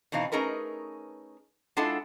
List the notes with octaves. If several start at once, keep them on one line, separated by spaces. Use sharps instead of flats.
B2 E3 C4 D#4 F5
A3 C#4 D#4 G#4 A#4 B4
G#3 D4 E4 F4 A4 F#5